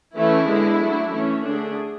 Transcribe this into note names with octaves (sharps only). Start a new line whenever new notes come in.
E3 A3 C#4 E4
D3 G#3 B3
F#3 A3 D4
E3 A3 C#4
D3 A3 D4 G#4